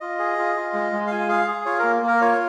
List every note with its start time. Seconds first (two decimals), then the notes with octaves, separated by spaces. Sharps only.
0.01 F4 D#5
0.19 G#4
0.38 F4
0.56 F4
0.74 G#3
0.92 G#3
1.07 F5
1.11 F4 G#5
1.29 G#4 F5
1.47 G#4
1.65 F4 C#5
1.79 A#3 A#4
2.02 A#3
2.08 A#4
2.21 F4 C#5